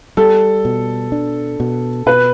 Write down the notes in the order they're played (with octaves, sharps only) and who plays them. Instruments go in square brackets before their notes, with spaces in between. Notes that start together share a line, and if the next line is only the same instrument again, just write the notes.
[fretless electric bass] G3 [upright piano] A4
[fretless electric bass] B2
D4
B2
[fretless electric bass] B2 [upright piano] B4